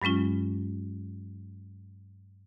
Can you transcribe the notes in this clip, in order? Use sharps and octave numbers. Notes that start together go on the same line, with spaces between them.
G2 F#3 G#3 C#4 F4